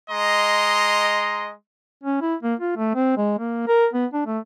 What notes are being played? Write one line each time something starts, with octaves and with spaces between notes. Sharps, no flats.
G#3 D#5 A#5 C6
C#4
E4
A#3
F4
A3
C4
G#3
A#3
A#4
B3
D4
A3